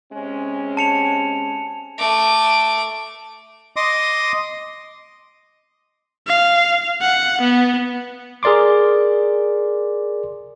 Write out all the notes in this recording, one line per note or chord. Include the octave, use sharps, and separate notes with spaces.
C3 G#3 C#4
A5 C#7 F7
A3 D6
D#5 C6 D6 D#6
F5
F#5
B3
G#4 A#4 D5 C6 D6